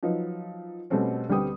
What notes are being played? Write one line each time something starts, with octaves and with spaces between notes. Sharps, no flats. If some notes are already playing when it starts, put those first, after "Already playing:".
F3 F#3 D#4 B4
B2 G3 A3 C4 C#4
D2 G3 B3 C4 G5 D#6